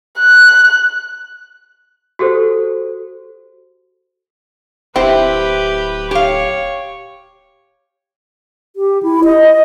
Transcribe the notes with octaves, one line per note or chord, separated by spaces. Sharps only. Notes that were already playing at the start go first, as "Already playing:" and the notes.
F#6
F#4 G4 A4 C5
D1 C4 E4 G4 B4
G4 C#5 F5
G4
E4
D#5